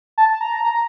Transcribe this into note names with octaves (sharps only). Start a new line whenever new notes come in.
A5
A#5
A#5